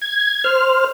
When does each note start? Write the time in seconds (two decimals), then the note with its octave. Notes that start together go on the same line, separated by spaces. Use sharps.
0.02 G#6
0.44 C5 F6